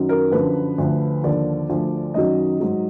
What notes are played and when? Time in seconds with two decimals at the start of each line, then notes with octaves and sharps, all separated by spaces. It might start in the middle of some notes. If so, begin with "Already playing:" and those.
Already playing: F#2 D#3 F#3
0.09 A#4
0.31 F#2 D3 F3 B4
0.78 D2 D3 F3
1.24 D#2 D3 F3 D5
1.70 D2 D3 F3
2.14 F#2 D#3 F#3 D#5
2.60 G#2 F#3